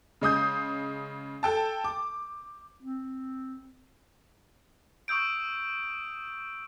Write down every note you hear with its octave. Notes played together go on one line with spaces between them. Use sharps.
C#3 G#3 D#6 G6
A4 G5 A5
D6
C4
C#6 D#6 E6 G6 D7